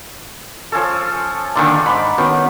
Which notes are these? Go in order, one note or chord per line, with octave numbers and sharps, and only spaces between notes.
F3 C#4 A4
A#2 D3 D#3 D4
G#2 B5 D6
D#3 B3 C#4 F#4